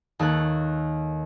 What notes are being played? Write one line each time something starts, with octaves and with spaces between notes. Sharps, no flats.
D#2 A4 C#5 F#6